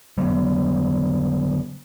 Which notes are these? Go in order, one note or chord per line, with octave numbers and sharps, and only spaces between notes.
D3 F#3 G3 B3